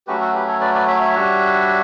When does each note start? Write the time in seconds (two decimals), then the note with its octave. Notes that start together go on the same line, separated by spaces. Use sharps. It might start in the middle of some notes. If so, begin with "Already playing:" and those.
0.07 F#3 A3 C#4 F#4 G4 B4
0.21 F#4 A4
0.34 G4 B4
0.48 A4 C#5
0.61 B4 D5
0.75 B4 D5
0.88 C#5 E5
1.01 C#5 E5
1.15 G3 D4 F#4